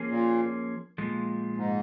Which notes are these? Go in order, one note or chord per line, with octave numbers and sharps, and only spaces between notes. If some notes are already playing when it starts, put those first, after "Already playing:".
Already playing: F3 A#3 C#4 G#4
A#2
A#2 F3 G#3
G#2